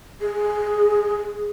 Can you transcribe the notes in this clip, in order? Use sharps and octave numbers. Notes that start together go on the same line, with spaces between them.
G#4